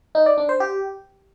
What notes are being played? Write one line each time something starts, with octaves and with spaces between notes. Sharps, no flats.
D#4
D5
D4
C5
G4